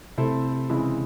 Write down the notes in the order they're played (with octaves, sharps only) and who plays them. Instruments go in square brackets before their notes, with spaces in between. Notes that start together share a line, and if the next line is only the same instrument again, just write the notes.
[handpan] C3 [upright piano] A3 C4 E4 A4 C5
[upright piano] C#3 E3 G#3 C4 E4